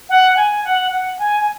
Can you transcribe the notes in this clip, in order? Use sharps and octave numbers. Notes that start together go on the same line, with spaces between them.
F#5
G#5
F#5
F#5
G#5
G#5